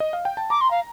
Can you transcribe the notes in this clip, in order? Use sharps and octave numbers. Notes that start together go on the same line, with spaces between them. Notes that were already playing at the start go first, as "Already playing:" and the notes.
D#5
F5
G5
A5
A#5 D6
C6
F5